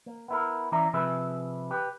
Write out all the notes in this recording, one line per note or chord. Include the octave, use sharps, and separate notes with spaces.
A#3
B3 E4 A#4
E3 C#4 D5 E5 A#5
C3 F3 G#4 B4 E5
G4 B4